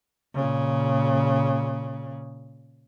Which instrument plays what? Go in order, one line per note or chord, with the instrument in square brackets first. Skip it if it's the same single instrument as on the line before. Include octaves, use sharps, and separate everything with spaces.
[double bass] A#2 C#3